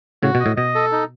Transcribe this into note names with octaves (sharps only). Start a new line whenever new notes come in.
A2 C#3 F#4
B2
D#5
A2
B2 D#5
A4
D#4